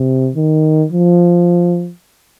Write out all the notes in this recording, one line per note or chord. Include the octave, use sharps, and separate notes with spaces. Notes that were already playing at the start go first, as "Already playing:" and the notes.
Already playing: C3
D#3
F3